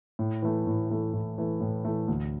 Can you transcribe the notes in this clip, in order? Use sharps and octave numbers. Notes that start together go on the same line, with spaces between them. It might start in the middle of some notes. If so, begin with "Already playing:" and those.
A2
E3 A3
A2
E3 A3
A2
E3 A3
A2
E3 A3
D2